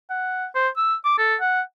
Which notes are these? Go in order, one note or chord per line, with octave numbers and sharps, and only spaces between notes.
F#5
C5
E6
D6
A4
F#5